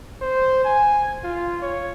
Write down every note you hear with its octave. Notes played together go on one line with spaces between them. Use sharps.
C5
G#5
F4
C#5